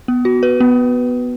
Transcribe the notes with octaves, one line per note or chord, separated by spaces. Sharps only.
B3
F#4
B4
B3